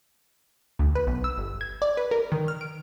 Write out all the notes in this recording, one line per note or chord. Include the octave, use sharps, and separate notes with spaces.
D2
B4
B1
E6
G1
G#6
D5
B4
A#4
D#3
F6
D7